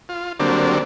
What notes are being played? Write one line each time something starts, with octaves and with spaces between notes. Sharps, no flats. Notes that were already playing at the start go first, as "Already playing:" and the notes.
F4
D3 F#3 G3 A#3 C4 D4